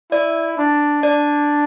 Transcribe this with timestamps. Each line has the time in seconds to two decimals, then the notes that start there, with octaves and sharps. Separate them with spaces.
0.12 E4 D5
0.58 D4
1.03 D4 D5